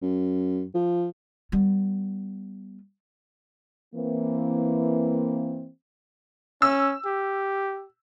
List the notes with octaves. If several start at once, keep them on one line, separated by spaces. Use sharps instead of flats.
F#2
F3
G3 B3
E3 A#3 C4
C#4 E6
G4